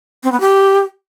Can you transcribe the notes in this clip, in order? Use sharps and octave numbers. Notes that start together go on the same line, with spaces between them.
C4
B3
G4